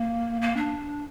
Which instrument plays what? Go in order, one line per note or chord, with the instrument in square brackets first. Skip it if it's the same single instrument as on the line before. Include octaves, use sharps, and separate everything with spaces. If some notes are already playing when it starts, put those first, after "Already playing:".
Already playing: [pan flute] A#3
A#3
D4